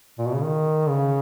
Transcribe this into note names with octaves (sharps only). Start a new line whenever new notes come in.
A#2
B2
C#3
D#3
C#3